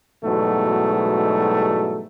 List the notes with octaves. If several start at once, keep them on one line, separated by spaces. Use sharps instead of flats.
E2 G#2 B2 F#3 G3 A3